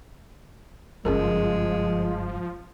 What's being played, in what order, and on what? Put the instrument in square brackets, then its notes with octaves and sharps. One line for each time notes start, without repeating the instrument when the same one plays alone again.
[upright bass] F#1 G2 [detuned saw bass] F3 [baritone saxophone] G#3 [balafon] C#4 G#4 A#4